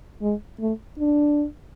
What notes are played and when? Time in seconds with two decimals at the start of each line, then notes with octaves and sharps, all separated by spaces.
0.22 G#3
0.60 A3
0.99 D4